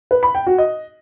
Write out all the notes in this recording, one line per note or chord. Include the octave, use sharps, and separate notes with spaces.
B4
B5
G5
F#4
D#5